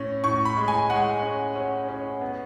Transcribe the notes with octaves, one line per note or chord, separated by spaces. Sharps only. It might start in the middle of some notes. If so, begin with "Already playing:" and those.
Already playing: A2 C#4
A2 C#6
B5
G#3
G#5
G#3 F#5
C#4
C#4
C#4
B3